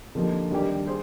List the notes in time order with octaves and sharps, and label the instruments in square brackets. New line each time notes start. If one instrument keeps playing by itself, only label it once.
[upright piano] D3 F3 A#3 D#4 G4
D#3 G3 D4 G4
G#4 C5